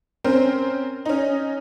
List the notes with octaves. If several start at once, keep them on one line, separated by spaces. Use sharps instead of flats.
C4 C#4 A#4 C5
C#4 D#4